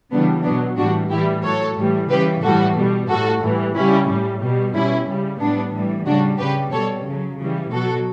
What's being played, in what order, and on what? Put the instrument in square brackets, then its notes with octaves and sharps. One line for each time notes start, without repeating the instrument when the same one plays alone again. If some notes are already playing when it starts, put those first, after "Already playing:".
[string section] C#3 E3 G3 B3 D4
B2 F#3 B3 D4
A2 E3 G3 D4 F#4
A2 E3 G3 E4 G4
A2 F#3 A4 C#5
A2 E3 G3
C#3 E3 G3 G4 B4
A2 E3 G3 F#4 A4
B2 G3
A2 G3 F#4 A4
A2 E3 G3
C#3 G3 C#4 E4
A2 G3
B2 G3
B2 G3 C#4 E4
C#3 G3
A2 G3 B3 D4
A2 E3 G3
C#3 G3 D4 F#4
C#3 G3 G4 B4
B2 G3 A4 C#5
C#3 F#3
C#3 E3 G3
B2 F#3 F#4 A4